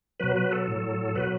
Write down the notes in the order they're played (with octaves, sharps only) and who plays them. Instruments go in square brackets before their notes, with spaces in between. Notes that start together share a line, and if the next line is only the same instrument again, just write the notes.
[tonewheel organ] B2 F#3 B4
B4
A4
A2 F#3
B2 F#3 B4